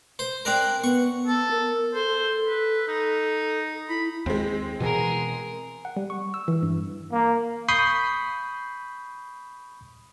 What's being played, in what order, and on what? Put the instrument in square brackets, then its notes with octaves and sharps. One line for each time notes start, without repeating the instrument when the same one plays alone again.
[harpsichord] C5
[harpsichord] C4 D4 A#4 [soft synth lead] F#6
[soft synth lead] B3 [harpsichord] C#6
[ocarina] B3 [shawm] A4
[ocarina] A#4
[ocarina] A4 [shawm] C5
[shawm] B4
D#4
[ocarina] E4 [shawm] B5
[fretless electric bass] D#2 [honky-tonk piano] G#3 C4
[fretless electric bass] B2 E3 [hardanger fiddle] G#4 A#4
[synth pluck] F#5
G3
C#6
E6
E3
G2
[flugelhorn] A#3
[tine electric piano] B5 C#6 D#6 G6 B6 C7